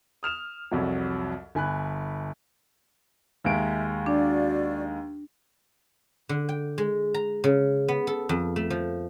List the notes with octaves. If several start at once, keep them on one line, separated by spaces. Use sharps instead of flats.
D#6 F6 E7 F7
C2 F2 F#3
G1 G#5 B5 F#6
D#2 G#3 E5 D7
D4 F#4 D5 F5
D3
G5
G#3
A#5
C#3
B3
A4
F2
A3
F3